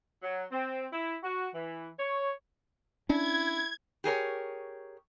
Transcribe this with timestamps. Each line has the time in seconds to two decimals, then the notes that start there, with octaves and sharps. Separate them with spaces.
0.22 F#3
0.52 C4
0.92 E4
1.23 F#4
1.54 E3
1.99 C#5
3.09 C#4 D4 E4 G#6
4.04 G4 G#4 A#4 C#5